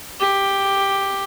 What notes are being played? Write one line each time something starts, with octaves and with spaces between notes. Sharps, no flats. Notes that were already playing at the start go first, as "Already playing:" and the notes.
G4